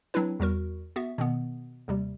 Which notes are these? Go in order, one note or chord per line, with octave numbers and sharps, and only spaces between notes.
F#3 C4 D4 E4 B4
E2 G3 F#4 A#4
B3 F#4 E5
B2 D#3 B3
D#2 C3 G3